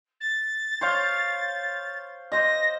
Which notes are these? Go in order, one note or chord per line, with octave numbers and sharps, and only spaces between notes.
A6
C5 C#5 F5
C5 D#5 A#6